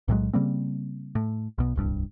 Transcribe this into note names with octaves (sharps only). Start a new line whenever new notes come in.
B1 A2 F#3 G#3
C#3 G3 A#3 C4
A2
B1 B2
D1 C2 G2